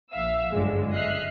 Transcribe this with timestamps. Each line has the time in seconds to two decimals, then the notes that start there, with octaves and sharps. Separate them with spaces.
0.12 A#1 E5 F5 E6
0.53 G1 C#2 F#2 D3 G#3
0.93 D#5 E5 F6 F#6 C7